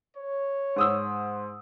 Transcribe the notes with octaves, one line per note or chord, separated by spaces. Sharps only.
C#5
G#2 D#6 E6